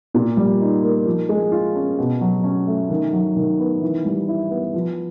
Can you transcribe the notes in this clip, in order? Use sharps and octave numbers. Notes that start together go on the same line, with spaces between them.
A#2
G3
D#4
A#3
F3
G#3
F4
C#4
B2
F#3
C#4
A3
D#3
F#3
D#3
B3
E3
G3
E4
B3
F3